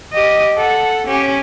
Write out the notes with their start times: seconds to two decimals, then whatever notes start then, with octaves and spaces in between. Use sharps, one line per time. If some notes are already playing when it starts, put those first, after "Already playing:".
0.13 G4 D#5
0.57 A4 F#5
1.07 C#4 G4